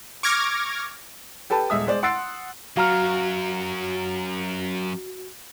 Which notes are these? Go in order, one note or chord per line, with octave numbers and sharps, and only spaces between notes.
C#6 D6 F6 G#6 A#6
G4 A4 B4 G5 A5
D#1 G#3 E5 D#6
G#3 C5 D5
F#5 C6 E6 A6 C7 D7
F#2 F#3 F#4 F5 A#5 F6